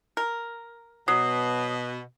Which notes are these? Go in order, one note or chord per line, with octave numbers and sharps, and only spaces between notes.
A#4
B2 F#3 D#6 C7